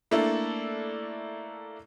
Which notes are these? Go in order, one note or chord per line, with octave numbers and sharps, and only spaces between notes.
A3 A#3 D4 E4 A4